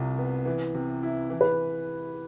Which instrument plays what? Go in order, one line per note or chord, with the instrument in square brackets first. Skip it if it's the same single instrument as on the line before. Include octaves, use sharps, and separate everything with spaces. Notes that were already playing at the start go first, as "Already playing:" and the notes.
Already playing: [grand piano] C2 C3 F4
B3
E3
C3
E4
E3
[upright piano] B4